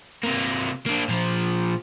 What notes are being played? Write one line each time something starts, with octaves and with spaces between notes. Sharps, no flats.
C3 A#3
A#3 D4
A#2 F3